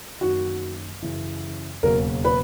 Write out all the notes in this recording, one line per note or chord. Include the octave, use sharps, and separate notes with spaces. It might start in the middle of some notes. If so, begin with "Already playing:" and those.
F#2 D#3 A#3 F#4
F#2 C#3 E3
E1 D#2 C#3 F#3 A#3 A#4
B4